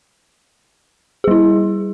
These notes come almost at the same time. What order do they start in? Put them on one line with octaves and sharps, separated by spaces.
G#4 G3 E4